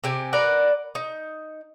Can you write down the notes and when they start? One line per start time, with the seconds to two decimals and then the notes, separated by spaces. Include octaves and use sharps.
0.04 C3 G4 G#5
0.33 A#4 B4 D5 F#5
0.95 D#4